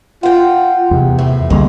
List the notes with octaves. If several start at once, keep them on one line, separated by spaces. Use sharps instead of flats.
F4 F#5 G5
E2 C3
A2
C2 D3 G#3 A#3